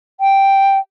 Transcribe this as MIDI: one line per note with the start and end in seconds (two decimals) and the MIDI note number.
0.20 0.78 79